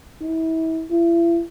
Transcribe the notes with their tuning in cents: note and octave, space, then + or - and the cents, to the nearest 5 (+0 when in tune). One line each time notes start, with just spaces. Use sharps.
E4 -35
E4 +40